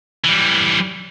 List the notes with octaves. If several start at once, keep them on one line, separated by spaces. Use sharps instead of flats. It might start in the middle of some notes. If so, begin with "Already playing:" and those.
E3 G3